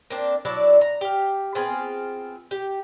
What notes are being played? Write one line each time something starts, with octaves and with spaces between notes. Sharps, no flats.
A#3 C4 D4
F#3 D4 E4 D5
A#5
G4 F5
B3 C4 F4 G#4
G4